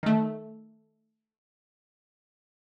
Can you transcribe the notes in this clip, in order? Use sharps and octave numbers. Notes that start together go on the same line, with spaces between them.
D#3 A3